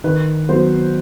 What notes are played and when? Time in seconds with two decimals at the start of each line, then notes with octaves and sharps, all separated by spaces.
0.04 D#3 B4
0.49 F#3 B3 C5